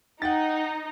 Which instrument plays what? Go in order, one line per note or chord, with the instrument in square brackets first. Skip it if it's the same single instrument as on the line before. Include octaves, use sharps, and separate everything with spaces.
[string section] D#4 [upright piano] F#5 G5 A6